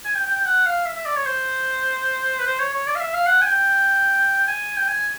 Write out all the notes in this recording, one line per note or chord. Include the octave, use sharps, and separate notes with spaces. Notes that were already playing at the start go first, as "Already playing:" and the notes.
G#5
G5
G5
G5
F#5
F5
E5
E5
D5
C#5
C5
B4
C5
C#5
C#5
D5
F5
E5
F5
F#5
G#5
G5
G#5
G5
G#5